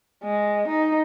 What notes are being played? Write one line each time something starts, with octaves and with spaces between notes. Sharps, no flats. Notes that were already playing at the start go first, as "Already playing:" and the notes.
G#3
D#4